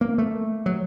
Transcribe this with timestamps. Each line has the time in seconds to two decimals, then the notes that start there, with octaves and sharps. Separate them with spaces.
0.01 A#3
0.18 A3
0.66 F#3